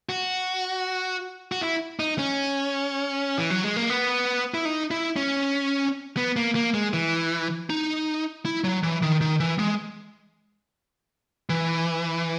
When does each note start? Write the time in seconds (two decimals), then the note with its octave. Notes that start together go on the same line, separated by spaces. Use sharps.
0.09 F#4
1.52 F#4
1.61 E4
2.00 D#4
2.19 C#4
3.38 E3
3.50 F#3
3.64 G#3
3.76 A#3
3.90 B3
4.54 E4
4.65 D#4
4.91 E4
5.16 C#4
6.17 B3
6.36 A#3
6.56 A#3
6.74 G#3
6.93 E3
7.70 D#4
8.45 E4
8.64 F#3
8.84 E3
9.03 D#3
9.21 D#3
9.40 E3
9.59 G#3
11.49 E3